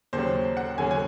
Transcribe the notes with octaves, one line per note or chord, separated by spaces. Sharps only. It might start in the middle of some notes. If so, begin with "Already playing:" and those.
D#2 C#3 F#3 C5
F#5
D#2 C#3 F#3 G#5
G#5